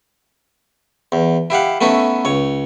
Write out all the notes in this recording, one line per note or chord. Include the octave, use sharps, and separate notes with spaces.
E2
E4 G4 F5 F#5
A3 B3 C#4 D#4 E4
C#2 C#5